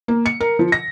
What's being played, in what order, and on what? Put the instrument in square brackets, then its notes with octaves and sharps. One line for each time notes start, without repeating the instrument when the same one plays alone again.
[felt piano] A#3
C#7
A#4
F3
A#6